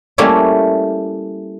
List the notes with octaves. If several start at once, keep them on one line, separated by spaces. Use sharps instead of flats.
G3 A3 A#3 C#4 E4